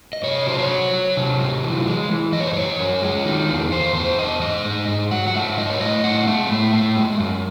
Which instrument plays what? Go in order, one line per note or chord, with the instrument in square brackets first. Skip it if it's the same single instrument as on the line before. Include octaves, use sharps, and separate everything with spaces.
[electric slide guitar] D#5
C3 C#5
F#3 C5
C#5
F#3
F#3
C3
F#3
E3
G#3
E3
F#2 D#5
C#5
C5
E3 C#5
F#2
G#3
D#3
E2
E2 C5
E2 C5
E2 D#5
G#2 D#5
G#2
G#2
F#3 F#5
F#5
G#2 E5
F#3 D#5
C#5
A2 D#5
A2 F#5
G#3 E5
A2
A2
G#3
F#2